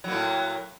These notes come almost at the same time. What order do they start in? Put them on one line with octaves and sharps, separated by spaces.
F#3 A#3 A2